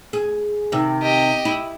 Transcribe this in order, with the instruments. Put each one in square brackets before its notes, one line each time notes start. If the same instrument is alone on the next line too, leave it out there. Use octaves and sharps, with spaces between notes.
[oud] G#4
C3 D#3
[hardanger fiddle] G4 D#5
[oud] E4